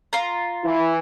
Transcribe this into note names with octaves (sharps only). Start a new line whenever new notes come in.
F4 A#5
E3 E4